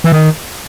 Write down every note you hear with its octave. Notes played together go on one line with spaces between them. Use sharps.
E3
D#3